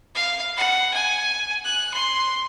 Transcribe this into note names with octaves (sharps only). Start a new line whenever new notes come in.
F5
F#5
G#5
F#6
C6